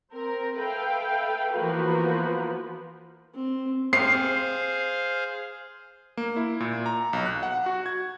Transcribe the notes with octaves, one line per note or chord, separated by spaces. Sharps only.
C4 A#4
A4 B4 E5 F5 G5
E3 F3 A#3 B3 F#4 B4
C4
C4 G#4 C5 F5 C7
A#3
E4
A#2
A#5
B1
F#6
F#5
F#4
G#6